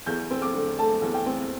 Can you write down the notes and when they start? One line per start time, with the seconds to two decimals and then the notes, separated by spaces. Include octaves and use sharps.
0.06 E2 G6
0.31 C4
0.42 D6
0.54 D3
0.79 A3 A5
1.02 E2
1.14 G5
1.26 C4